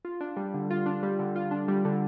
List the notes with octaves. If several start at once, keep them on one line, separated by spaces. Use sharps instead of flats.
F4
D4
G3
D3
F4
D4
G3
D3
F4
D4
G3
D3